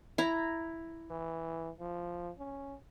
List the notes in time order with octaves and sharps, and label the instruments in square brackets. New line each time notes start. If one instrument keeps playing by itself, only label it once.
[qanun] E4 A#5
[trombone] E3
F3
C#4